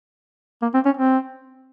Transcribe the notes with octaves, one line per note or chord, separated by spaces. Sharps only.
A#3
C4
C#4
C4